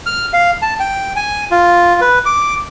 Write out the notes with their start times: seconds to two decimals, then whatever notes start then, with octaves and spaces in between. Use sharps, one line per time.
0.06 F6
0.33 F5
0.62 A5
0.80 G5
1.16 G#5
1.51 F4
2.01 B4
2.26 D6